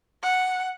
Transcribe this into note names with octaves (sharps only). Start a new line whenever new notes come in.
F#5